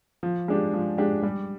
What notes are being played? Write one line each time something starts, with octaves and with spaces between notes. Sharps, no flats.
F3
G#3 D4 G4
F3
G#3 D4 G4
G3